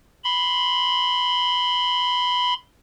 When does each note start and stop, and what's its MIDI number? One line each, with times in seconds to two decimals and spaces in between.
0.24 2.54 83
0.24 2.54 84